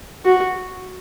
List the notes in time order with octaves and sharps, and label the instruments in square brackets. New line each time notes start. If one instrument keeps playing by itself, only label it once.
[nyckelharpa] F#4